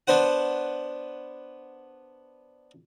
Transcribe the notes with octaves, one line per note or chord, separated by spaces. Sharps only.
B3 D4 C5 F#5